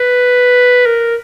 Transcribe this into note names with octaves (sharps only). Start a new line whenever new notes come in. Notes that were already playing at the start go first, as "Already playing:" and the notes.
Already playing: B4
A#4